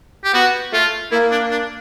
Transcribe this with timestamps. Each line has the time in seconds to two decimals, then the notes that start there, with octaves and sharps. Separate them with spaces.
0.24 G4
0.33 B3 F#4
0.73 A3 F4
1.12 A#3 E4
1.31 D4
1.51 D4